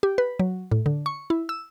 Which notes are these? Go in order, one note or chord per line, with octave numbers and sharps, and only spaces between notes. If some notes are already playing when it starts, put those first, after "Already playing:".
G4
B4
F#3
A2
D3
C#6
E4
E6